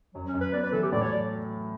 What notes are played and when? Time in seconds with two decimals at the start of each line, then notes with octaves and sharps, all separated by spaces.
0.14 F#2 F#3
0.27 C#4
0.34 F#2
0.41 B4
0.53 B3 D5
0.63 B4
0.73 E3 A4
0.83 G4
0.92 A2 D5
1.01 C#5
1.11 F#3 D5